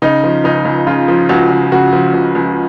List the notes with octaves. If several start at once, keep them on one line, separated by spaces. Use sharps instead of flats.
C#3 D#4
F3
C#2 D#4
C#2
C#3 F4
F3
C#2 F#4
C#2
C#3 F#4
F3
C#2
C#2